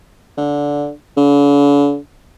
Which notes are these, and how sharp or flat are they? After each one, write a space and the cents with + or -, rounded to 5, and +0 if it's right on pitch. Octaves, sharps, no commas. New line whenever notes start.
D3 -15
D3 -45